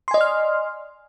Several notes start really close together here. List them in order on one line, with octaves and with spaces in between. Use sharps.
C6 G#5 D#5 D5 F6